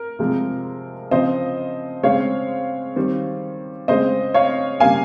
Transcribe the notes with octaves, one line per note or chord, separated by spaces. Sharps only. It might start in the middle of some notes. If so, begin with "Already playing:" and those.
Already playing: A#4
C3 F3 G#3
C#3 F3 C4 C5 D#5
C#3 G#3 C4 C#5 F5
D#3 G3 C4
C#3 G#3 C4 C5 D#5
C#5 F5
C#3 G3 A#3 F5 G#5